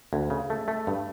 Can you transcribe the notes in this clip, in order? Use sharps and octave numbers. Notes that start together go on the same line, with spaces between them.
D2
C#3
A3
A3
G2